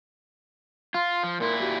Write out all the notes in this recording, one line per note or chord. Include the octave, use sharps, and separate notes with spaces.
F4 F5 C6 F6
F3
A#2 E4 A#4 C6
F#4 G4